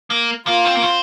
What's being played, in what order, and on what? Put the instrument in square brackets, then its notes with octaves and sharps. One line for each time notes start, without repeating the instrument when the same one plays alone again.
[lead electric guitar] A#3
[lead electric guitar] A#3 [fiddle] F4
[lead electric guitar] C4
A#3
C4